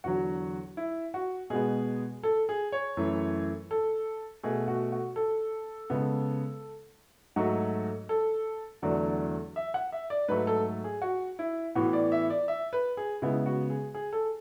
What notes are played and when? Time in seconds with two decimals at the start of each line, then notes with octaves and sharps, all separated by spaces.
0.04 E2 D3 F#3 F#4
0.77 E4
1.14 F#4
1.50 B2 G#3 B3 G#4
2.23 A4
2.49 G#4
2.72 C#5
2.97 F#2 E3 A3
3.71 A4
4.43 B2 A3 G#4
4.68 F#4
4.92 F#4
5.16 A4
5.90 C#3 G#3 B3
7.36 G#2 F#3 A3 F#4
8.09 A4
8.82 E2 D3 F#3 A3 D5
9.56 E5
9.74 F#5
9.92 E5
10.10 D5
10.28 G#2 F#3 A3 B4
10.47 A4
10.84 G#4
11.02 F#4
11.39 E4
11.75 A2 E3 B3 F#4
11.93 D5
12.12 E5
12.30 D5
12.48 E5
12.73 B4
12.97 G#4
13.22 C#3 G#3 B3 E4
13.46 F#4
13.70 G#4
13.95 G#4
14.13 A4